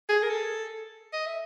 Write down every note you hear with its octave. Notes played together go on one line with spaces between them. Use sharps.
G#4
A#4
A4
D#5
E5